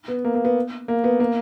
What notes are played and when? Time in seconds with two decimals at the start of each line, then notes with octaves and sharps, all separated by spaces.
0.08 B3
0.25 A#3
0.35 A#3
0.45 B3
0.88 A#3
1.04 B3
1.20 A#3